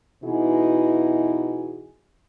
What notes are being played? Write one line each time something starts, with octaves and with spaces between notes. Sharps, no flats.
B2 E3 D#4 E4 F#4 G#4